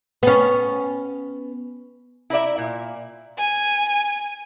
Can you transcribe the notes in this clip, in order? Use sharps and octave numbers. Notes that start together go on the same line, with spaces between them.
B3 C#4
E4 A#4 D5 E5
A#2
G#5